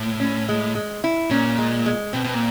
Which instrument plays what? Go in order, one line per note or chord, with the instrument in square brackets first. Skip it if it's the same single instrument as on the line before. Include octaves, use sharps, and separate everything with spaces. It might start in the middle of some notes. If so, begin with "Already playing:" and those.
Already playing: [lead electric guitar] A2
[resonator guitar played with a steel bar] C#4
G#3
G#3
E4
[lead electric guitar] A#2 [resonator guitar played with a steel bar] C#4
[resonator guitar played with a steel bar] G#3
G#3
[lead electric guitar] B2 [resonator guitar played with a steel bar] C4
[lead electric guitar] B2
A#2